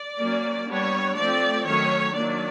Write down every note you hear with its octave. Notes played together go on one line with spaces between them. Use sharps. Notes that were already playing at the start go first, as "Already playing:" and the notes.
Already playing: D5
F#3 A#3 C#4
G3 B3 D4 C#5
F3 A3 C4 D5
D#3 F#3 A3 C#4 C#5
D#3 F#3 A#3 D4 D5